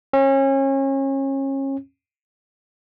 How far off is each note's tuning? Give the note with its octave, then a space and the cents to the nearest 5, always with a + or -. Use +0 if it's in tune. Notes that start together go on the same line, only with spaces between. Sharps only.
C#4 -30